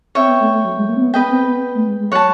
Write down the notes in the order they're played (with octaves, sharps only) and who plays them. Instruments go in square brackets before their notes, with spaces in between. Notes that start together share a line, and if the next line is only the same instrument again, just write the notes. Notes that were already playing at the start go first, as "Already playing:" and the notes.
[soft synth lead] C4 [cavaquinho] C#5 E5 G5
[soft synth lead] B3
A3
A3
F#3
G#3
A#3
C4
B3
[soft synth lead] B3 [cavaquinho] B4 D#5 G5
[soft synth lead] C4
B3
A3
G#3
G#3
[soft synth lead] F#3 [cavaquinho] C#5 F#5 A5